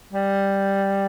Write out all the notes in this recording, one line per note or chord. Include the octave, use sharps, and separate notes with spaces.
G3